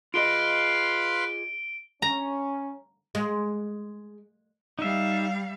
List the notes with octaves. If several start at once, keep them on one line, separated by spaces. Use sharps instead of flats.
F4 G#4 B4 D#5 F5 C6 D7 G7
C#4 A#5
G#3
G3 D#4 E5 F5